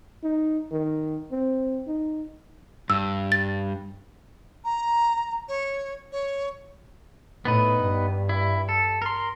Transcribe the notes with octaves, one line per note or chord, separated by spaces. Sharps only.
D#4
D#3
C4
D#4
G2 E6
A6
A#5
C#5
C#5
A2 B3 D#4 B4
G2
E4
A4
A#4 C6